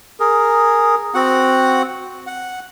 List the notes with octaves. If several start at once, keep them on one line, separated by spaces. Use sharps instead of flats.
G#4 A#4
C4 F#4 F#5
F#5